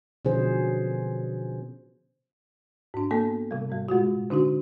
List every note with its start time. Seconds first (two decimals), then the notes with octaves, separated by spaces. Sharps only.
0.25 B2 D3 F3 C#4 G#4 C5
2.94 G#2 D4
3.11 A#3 B3 A4
3.51 C3 G3
3.70 G#2 G3
3.89 A#2 G#3 F4 F#4
4.30 D3 D4 D#4 F#4